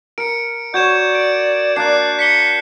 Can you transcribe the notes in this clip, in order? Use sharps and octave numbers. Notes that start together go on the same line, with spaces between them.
A#4 C#7 D7
F#4 C#5 D5 G6 G#6 E7
D7
A#3 D4 F#6 C7
B6 C#7 G7